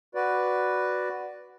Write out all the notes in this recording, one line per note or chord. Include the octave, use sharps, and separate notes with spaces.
F#4 B4 D5